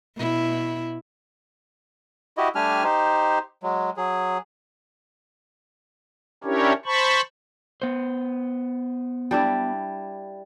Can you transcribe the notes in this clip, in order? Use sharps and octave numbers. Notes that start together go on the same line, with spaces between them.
B2 E4
E4 F#4 G4 D#5
G3 A3 D4 G4 G#5 F6
D#4 G4 C5
F#3 G#3
F#3 G#4
C#4 D4 E4 G4 A#4 C#5
C5 A5 B5 C#6
B3 C5
G3 D4 E4